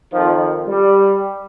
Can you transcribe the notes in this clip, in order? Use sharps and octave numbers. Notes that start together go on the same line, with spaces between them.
F2 D#3 F3
G3